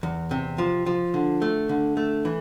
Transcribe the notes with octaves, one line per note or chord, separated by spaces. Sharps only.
E2
C3
F3
F3
D3
A3
D3
A3
E3